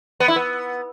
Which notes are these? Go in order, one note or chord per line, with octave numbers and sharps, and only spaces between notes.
B3
E4
B3